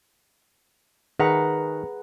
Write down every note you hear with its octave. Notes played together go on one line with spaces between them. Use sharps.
D#3 G#4 B4 F#5 A#5